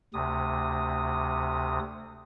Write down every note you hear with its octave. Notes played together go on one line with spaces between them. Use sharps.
D2 C3 D#6